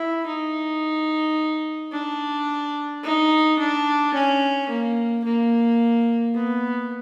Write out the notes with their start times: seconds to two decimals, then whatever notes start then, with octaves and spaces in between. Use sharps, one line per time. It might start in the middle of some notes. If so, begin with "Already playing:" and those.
Already playing: E4
0.26 D#4
1.92 D4
3.03 D#4
3.58 D4
4.14 C#4
4.69 A#3
5.24 A#3
6.34 B3